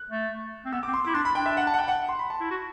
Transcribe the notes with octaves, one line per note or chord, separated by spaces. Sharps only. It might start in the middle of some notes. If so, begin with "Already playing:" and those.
Already playing: F#6
A3
C4
B3 E6
C4 D6
C6
E4 D6
D4 C6
B5
D4 G5
E5
F#5
A5
F#5
G5
F#5
C6
B5
A5
E4
F#4